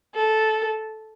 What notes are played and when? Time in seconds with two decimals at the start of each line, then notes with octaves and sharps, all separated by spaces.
0.16 A4